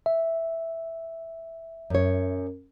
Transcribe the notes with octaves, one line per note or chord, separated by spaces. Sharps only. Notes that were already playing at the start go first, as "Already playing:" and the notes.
E5
F#2 C#5